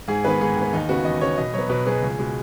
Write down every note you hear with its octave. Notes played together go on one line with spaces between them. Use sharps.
G#2 G#4
D#3 B3 B4
G#2 G#4
D#3
B3
D#2 D#4
C#3 B3 F#4
D#2 D#5
C#3 B3 C#5
B2 D#5
F#3 B3 C#5
B2 B4
F#3 B3 G#4
C#2
B2 G#3